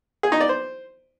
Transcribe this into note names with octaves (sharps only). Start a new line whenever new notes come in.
G#4
D#4
D5
C5